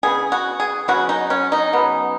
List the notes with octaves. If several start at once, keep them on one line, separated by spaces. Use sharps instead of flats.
C#3 F#3 B3 G#4
F#4
G#4
C#3 F#3 B3 F#4
D#4
C#4
D#4
C#3 F#3 B3